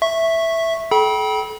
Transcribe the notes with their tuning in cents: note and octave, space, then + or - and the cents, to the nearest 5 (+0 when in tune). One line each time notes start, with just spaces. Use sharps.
E5 +0 C#6 -10
A4 -40 G5 -20 B5 -35